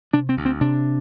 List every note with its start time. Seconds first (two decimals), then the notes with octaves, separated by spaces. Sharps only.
0.13 C3 D4
0.29 C4
0.37 D2
0.45 C4
0.61 C3 D4